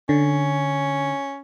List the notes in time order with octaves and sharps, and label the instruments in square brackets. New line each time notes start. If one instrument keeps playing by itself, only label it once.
[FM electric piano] D3 [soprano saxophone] C#4